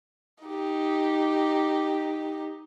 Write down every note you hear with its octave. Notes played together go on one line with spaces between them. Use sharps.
D#4 G4